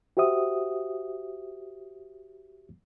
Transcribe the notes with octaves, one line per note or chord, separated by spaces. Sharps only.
F#4 G4 C5 E5 D#6